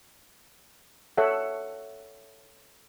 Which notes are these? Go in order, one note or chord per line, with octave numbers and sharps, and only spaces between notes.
A4 C#5 E5 F#5